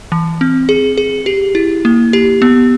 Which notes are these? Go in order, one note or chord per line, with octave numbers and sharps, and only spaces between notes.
E3
C4
G#4
G#4
G4
E4
A#3
G4
B3